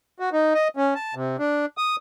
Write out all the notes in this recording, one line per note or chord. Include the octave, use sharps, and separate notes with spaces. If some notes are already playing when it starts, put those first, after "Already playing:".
F#4
D#4
D#5
C#4
A5
C3
D4
D#6